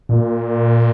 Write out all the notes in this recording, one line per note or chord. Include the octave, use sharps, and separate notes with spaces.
A#2